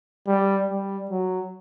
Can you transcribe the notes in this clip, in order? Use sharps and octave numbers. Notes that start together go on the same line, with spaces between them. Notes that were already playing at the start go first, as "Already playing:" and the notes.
G3
G3
F#3